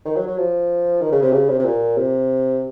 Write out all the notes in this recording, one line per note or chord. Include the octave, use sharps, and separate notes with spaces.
D#3
F#3
F#3
F3
D#3
C#3
C3
C#3
C3
C3
A#2
C3